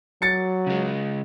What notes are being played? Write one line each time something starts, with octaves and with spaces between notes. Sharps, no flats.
F#3 A6 C#7
C#3 G#3